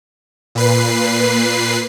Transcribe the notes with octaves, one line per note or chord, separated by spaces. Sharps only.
A#2 B4 C7